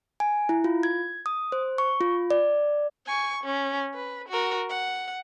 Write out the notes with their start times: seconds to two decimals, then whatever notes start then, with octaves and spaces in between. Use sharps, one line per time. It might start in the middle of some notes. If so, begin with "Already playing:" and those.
0.20 G#5
0.49 E4
0.64 F4
0.83 G#6
1.26 D#6
1.52 C5
1.78 C#6
2.01 F4
2.31 D5
3.06 G#5 C#6
3.44 C#4
3.95 B4
4.29 F#4 A#4
4.70 F#5